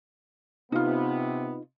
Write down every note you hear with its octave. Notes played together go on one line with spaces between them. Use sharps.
C3 B3 D#4 F4